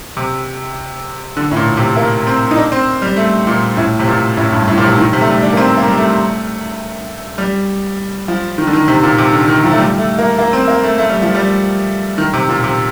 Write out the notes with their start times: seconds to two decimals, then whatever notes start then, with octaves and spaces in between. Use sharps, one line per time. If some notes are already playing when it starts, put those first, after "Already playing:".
0.17 C3
1.37 D3
1.51 A2
1.56 A#2
1.77 C3
1.97 A#3
2.27 C4
2.51 D#4
2.57 D4
2.72 C4
3.02 G3
3.17 A3
3.47 A#2
3.77 A2
3.99 C3
4.07 A#2
4.37 A2
4.52 G2
4.68 A2
4.78 A#2
4.82 C3
4.98 D#3
5.13 C3
5.21 A3
5.27 G3
5.42 D4
5.53 A#3
5.57 C4
5.77 A#3
5.88 G3
5.98 A3
7.38 G3
8.28 F3
8.58 D#3
8.67 D3
8.73 D#3
8.88 C3
9.03 A#2
9.18 C3
9.33 D3
9.48 D#3
9.64 F3
9.72 A3
9.78 G3
9.98 A3
10.19 A#3
10.39 A#3
10.53 C4
10.68 A#3
10.83 A3
10.98 A3
11.10 G3
11.22 F3
11.35 G3
12.18 D#3
12.33 C3
12.49 A#2
12.64 C3